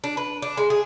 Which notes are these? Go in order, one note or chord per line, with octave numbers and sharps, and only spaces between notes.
D4
B4
D4
G#3
G#4